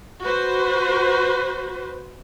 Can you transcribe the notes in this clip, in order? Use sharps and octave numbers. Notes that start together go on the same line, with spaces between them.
F#4 B4 C5